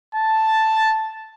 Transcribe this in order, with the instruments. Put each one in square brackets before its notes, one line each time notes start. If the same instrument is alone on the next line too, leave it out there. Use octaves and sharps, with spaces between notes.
[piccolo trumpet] A5